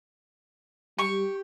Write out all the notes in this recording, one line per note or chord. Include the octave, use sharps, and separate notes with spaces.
G3 G4 C#6